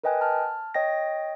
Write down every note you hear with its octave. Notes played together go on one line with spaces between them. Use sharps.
A#4 B4 D#5 G5 G#5 F#6
A5 F6
C#5 D#5 G5 A#6